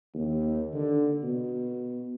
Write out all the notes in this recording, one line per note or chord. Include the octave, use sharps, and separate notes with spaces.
D#2
D3
B2